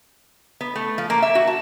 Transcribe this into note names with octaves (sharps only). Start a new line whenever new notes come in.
B3
A3
F3
A#3
E5
F#4
A5